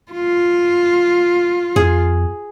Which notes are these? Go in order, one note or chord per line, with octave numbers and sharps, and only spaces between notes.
F4
F2 G#4